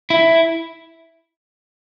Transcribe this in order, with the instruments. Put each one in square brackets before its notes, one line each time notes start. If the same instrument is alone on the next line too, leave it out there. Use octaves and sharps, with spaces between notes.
[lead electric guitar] E4